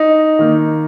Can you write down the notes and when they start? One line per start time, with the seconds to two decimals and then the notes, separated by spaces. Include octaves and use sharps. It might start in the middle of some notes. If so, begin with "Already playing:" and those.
Already playing: D#4
0.39 D#3 A#3